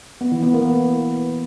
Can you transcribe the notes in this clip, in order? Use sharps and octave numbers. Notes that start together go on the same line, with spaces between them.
B3
E3
B3
A#3
A#3